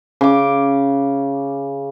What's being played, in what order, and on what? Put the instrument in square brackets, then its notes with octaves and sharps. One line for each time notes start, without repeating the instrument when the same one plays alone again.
[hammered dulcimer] C#3 D6